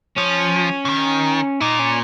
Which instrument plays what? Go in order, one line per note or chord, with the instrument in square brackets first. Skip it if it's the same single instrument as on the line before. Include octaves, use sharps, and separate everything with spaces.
[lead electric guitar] F3 [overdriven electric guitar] C#4
[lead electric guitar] C#3
D#3
[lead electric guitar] A#2 [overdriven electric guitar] D#4
[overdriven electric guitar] C#4